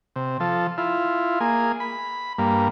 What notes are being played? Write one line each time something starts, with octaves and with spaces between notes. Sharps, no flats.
C3
F3 A4
E4 F4
A#3 G#4
B5
G2 A#3